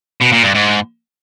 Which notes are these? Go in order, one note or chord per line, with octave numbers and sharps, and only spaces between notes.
B2
A#2
G2
G#2